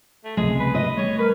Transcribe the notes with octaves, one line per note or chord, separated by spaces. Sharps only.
A3
E1 C#2 C3 G#3 G#4
B4
D#5
G3 A3 C#5
A#4 B4